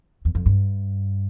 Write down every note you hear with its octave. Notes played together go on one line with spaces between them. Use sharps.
E2
F2
G2